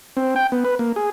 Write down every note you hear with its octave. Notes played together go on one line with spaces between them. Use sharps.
C4
G5
B3
B4
A#3
G#4